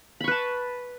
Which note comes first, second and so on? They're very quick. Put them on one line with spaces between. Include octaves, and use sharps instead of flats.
B5 C#6 B4 A5